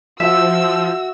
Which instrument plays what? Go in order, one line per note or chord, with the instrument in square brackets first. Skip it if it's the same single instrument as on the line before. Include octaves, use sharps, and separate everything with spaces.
[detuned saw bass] F3 [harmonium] F#4 [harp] E5 [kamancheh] E6